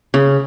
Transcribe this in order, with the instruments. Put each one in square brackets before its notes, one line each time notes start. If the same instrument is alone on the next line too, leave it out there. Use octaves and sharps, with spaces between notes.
[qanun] C#3